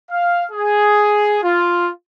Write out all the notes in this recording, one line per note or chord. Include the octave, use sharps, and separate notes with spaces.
F5
G#4
F4